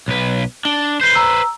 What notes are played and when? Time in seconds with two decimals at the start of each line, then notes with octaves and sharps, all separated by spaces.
0.08 B1 B4
0.65 D4 G7
1.01 B4 C5 G6 C7 G7
1.15 A#5 E6